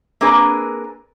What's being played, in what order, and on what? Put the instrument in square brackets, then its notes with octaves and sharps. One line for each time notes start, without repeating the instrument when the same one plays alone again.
[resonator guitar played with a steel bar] A#3 C4 D4 G#4 A#4 B4